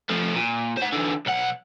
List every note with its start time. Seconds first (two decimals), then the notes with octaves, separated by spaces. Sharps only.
0.09 F3 A3
0.35 A#2
0.77 C5 F#5
0.93 D3 E3
1.26 B1 F#5